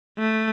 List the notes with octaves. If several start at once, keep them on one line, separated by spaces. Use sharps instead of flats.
A3